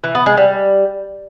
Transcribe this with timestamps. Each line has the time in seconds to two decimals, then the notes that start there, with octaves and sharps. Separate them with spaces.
0.04 E3
0.15 B3
0.26 G#3
0.37 G3